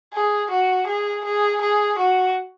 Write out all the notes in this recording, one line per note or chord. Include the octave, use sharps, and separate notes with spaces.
G#4
F#4
G#4
G#4
G#4
F#4